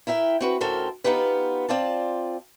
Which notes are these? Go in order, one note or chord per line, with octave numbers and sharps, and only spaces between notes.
E4 A#4 E5 G5
C4 F#4 B4
D2 C#4 A4 A#4 C5 G5
B3 D#4 F4 G4 B4
C4 F4 D5 A5